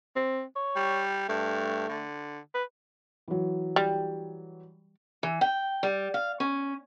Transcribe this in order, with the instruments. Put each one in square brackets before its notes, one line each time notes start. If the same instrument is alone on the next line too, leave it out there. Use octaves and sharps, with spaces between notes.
[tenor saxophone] C4
C#5
[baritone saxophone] G3
[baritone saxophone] G2 [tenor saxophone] A3
[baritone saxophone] D3
[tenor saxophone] B4
[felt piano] E3 F#3
[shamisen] G3
[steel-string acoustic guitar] E3
G5
G3
F5
C#4